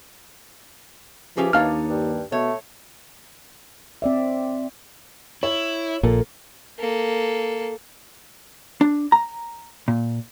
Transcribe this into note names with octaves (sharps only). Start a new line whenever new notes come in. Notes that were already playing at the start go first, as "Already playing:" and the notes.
E3 F3 C#4 G4 G#4
D#2 D4 D#4 C#5 F5 F6
G2
B2 A3 C#5
C4 D5 E5
E4 C#5
A#1 A#2 A#3 A4
A#3 A4
D4
A#5
A#2